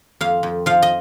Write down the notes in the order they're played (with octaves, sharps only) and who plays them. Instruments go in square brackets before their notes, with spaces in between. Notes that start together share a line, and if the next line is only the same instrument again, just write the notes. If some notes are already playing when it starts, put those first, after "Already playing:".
[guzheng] F2 F5
F2
F3 F5
D#5